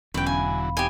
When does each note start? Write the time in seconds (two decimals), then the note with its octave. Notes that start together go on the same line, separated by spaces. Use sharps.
0.14 E1 E2 D3 E3 F#3 C#4 B4 G5
0.26 F5 G#5 B5
0.77 C4 D#4 G4 G#5